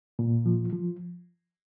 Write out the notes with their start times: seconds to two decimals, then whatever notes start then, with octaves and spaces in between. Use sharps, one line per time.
0.19 A#2
0.46 F3
0.73 F3